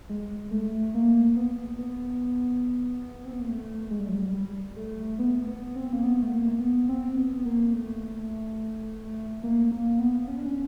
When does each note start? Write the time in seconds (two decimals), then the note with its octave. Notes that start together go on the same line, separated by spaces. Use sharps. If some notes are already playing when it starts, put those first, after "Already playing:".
0.09 G#3
0.51 A3
0.94 A#3
1.37 B3
1.79 B3
3.25 C4
3.33 B3
3.41 A#3
3.49 A3
3.91 G#3
3.99 G3
4.08 F#3
4.15 G3
4.34 G3
4.76 A3
5.19 B3
5.47 B3
5.76 C4
5.93 A#3
6.04 B3
6.22 A3
6.32 A#3
6.60 B3
6.89 C4
7.17 B3
7.45 A#3
7.73 A3
9.43 A#3
9.71 A#3
9.99 B3
10.28 C#4
10.37 D4
10.46 C#4